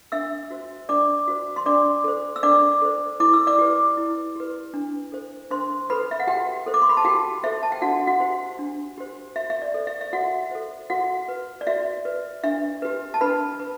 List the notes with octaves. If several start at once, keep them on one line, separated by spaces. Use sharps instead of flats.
D4 E5 E6
F#4 C5
D4 D5 D6
F#4 C5
C6
D4 D5 D6
A4 C5
E6
D4 D5 D6
A4 C5
E4 D6
E6
D5 D6
G4 B4
E4
G4 B4
D4
A4 C5
D4 C5 C6
A4 B4 C5 B5
E5
F#5
F#4 G4 G5
A4 C5
D6
C6
B5
A5
F#4 G4 G5
A4 C5 E5
A5
G5
D4 F#4 F#5
F#4 F#5
G4 C5
D4
G4 C5
F#4 E5
E5
D5
A4 C5
E5
E5
F#4 F#5
A4 C5
F#4 F#5
B4
D5
F#4 E5
B4
D4 E5
G4 B4
A5
D4 B4 B5
B4